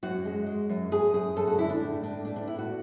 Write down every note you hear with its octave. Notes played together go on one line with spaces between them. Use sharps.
F#2 F#4
G#3
G#3
F#2
F#2 G#4
F#2 G#4
F#2 A4
F#4
D3 E4
D4
A2
A2 D4
A2 D4
D4
B3 E4
F#4